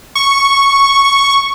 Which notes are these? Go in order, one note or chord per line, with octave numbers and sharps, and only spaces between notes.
C#6